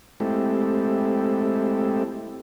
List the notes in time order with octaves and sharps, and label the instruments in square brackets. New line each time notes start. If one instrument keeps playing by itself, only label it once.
[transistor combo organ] G#3 A3 C4 E4 G4 A4